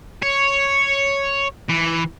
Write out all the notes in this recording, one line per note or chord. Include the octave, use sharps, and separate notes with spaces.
C#5
E3